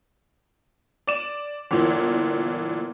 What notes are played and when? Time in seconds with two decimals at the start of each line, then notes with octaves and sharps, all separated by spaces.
1.07 D5 E7
1.71 G1 A#2 E3